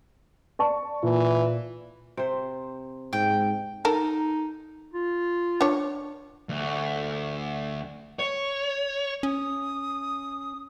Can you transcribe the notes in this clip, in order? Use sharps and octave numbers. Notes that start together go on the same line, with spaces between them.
D5 A5 C#6
A#2 E3
C3 C5
G#2 G5
D#4 A4 A#4
F4
D4 C#5
D2
C#5
C#4 D#6